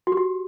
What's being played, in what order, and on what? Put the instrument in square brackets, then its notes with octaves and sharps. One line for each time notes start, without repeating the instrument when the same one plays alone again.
[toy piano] F#4
G4
F#4